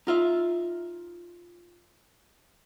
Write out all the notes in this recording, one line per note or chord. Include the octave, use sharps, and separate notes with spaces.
D#4 F4 E5